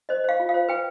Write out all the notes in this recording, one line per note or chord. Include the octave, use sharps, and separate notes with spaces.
C5 D#5
C5 F5
F4
F5
C5
B4 G5